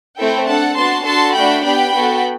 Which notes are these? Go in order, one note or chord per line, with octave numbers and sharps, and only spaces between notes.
A3 C4 E4 A4 E5 G5
D4 A4 F#5 A5
B3 D4 F#4 A5 C6
D4 F#4 A4 A5 C6
A3 D4 F#4 G5 B5
B3 D4 G4 G5 B5
B3 F#4 A4